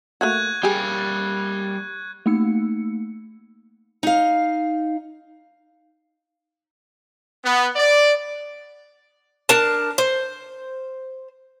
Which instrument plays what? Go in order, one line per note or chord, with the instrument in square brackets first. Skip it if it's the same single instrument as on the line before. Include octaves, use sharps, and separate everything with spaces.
[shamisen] A3 A#3 F#4 [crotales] C#6 F#6 G#6
[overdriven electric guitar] G3 A#3 [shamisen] G4 G#4
[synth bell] A3 A#3 D#4 E6 C#7
[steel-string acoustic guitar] D#4 F5
[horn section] B3
D5
[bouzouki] D4 A#4 A5
C5